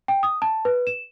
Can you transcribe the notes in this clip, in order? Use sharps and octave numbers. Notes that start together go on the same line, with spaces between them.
G5
D#6
A5
B4
E7